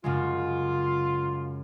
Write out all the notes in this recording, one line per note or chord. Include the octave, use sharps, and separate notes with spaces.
F#2 C#3 G#3 F4